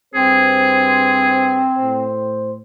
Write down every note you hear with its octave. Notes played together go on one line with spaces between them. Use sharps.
G2 C4 G#4 B4 C5
A2 C5